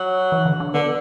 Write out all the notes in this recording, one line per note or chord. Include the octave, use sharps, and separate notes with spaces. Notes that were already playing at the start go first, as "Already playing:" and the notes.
Already playing: F#3
E3
D3
D3
D3 B3